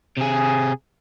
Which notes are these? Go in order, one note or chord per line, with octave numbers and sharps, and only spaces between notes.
C3 G#4